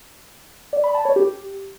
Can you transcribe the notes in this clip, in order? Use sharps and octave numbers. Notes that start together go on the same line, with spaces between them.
D5
B5
A5
C#5
G4